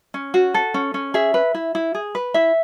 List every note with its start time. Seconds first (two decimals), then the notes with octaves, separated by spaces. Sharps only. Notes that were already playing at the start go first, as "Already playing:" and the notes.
0.14 C#4
0.34 F#4
0.54 A4
0.74 C#4
0.94 C#4
1.14 G#4 E5
1.34 B4
1.54 E4
1.75 E4
1.95 G#4
2.15 B4
2.34 E4 E5